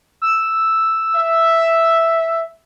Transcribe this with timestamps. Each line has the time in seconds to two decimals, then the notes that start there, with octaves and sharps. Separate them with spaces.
0.22 E6
1.16 E5